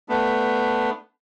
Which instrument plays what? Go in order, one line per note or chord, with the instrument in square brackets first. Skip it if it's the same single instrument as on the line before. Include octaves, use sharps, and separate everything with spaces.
[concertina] A3 B3 D4